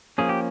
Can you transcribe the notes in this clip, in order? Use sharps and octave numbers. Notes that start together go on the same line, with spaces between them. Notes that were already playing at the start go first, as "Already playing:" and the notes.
F3 A#3 C#4 G#4
G4